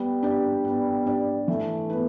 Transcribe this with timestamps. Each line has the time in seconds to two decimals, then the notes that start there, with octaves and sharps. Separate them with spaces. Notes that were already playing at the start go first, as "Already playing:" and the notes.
Already playing: G3 B3
0.23 D4 G4 D5
0.64 B3
1.06 D4 G4 D5
1.48 E3 A3
1.90 B3 E4 B4